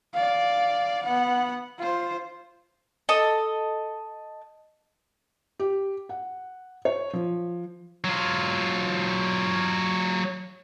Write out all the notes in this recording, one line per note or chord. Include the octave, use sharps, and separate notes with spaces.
D5 F5
B3 F#5
F4 C5
A4 D#5
G4
F#5
C#5
F3
F#3 F4